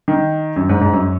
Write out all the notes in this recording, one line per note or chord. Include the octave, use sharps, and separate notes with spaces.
D#3
F#2
G#2
G#2
F#2